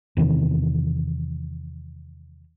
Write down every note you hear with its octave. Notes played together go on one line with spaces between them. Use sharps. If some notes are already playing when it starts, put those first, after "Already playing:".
E2 C3 D#3 E3